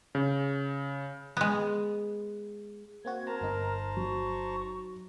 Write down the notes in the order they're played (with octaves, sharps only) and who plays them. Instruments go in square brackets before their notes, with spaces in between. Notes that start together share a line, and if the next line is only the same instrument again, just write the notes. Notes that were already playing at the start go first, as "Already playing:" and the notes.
[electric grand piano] C#3
[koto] G#3 B3
[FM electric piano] A#3 C4 F#4 [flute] G#6
[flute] A#4 [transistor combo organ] C5 A5 A#5
[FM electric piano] G1 D#4
[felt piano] F#3 [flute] C#6